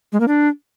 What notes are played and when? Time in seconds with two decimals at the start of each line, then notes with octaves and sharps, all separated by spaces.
0.12 G#3
0.20 A#3
0.28 D4